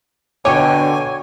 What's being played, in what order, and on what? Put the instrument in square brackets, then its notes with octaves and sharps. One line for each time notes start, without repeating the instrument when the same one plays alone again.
[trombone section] B2 D3 [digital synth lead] C#5 [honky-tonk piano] G5 D6 [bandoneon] G#5